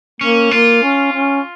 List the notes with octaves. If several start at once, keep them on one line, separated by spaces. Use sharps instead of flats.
A#3 C#4
A#3 F4
C#4
C#4